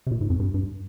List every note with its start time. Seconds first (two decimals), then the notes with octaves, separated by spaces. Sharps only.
0.07 C3
0.11 A#2
0.21 G#2
0.30 F2
0.40 G2
0.54 G2